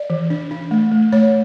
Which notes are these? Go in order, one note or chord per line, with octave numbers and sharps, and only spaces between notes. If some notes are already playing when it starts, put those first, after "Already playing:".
Already playing: D5
E3
D4
D4
A3
A3
A3 C#5